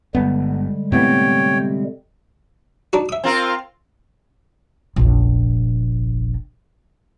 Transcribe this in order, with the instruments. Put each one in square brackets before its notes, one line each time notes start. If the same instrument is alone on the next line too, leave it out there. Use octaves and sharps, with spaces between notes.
[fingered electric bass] G1 [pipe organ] D3 G3 G#3 [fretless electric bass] B3
[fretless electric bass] A2 A3 B3 [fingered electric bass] C3 [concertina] C#5 G5
[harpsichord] D4 D#4 F#4
E5 D#6
[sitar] C4 F4 A#4
[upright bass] F1 A#1